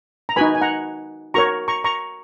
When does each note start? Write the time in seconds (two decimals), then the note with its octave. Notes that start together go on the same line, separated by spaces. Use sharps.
0.29 A#5
0.36 D#4 F#4 B4 G#5 B5
0.55 G#5
0.61 F#5 A#5
1.34 F#4 A#4 C#5 A#5 C#6
1.68 A#5 C#6
1.84 A#5 C#6